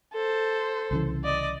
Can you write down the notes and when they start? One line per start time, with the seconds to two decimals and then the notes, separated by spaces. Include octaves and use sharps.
0.14 A4 C5
0.91 C2 C#3 E3
1.24 D5 D#5